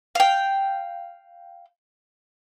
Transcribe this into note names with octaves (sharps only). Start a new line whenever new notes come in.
F5 G5